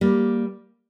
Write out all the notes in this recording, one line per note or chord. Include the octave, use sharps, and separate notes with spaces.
G3 A#3